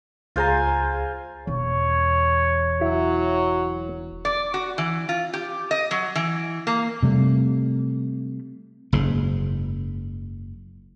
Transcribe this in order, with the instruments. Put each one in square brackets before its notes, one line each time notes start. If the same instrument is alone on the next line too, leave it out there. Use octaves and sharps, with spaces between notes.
[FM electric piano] C#2 G#4 A#5 [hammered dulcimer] F4 C5 G#5
[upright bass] E1 E2 [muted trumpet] C#5
[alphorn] F#3 [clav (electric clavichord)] E4
[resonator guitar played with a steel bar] D5
F#4
E3
F4
G4
D#5
F#3
E3
A#3
[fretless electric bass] C3 G3 A3
[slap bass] F#1 G#2